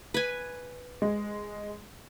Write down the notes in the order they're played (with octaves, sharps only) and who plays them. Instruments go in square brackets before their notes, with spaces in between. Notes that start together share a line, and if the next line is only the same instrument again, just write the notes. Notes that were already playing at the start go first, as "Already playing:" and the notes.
[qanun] B4 G#5
[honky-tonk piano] G#3